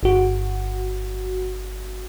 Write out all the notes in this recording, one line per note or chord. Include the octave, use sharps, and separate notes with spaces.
G1 F#4